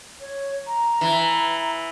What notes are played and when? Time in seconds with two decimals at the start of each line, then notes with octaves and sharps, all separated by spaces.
0.20 C#5
0.67 A#5
1.01 E3